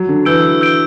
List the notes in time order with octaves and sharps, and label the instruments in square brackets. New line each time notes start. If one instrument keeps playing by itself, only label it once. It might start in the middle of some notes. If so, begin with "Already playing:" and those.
Already playing: [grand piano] F#3
D3
[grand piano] E3 [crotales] E6 G6 D7 G7
[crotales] E6 G6 D7 G7